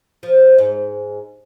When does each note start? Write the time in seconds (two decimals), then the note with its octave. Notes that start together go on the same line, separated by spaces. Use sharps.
0.23 F3
0.58 G#2